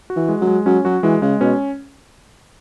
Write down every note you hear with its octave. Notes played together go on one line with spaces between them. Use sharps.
F#4
E3
G#3
F#3
G#3
F#3 C#4
F#3 F#4
E3 G#3
C#3 G#3
B2 C#4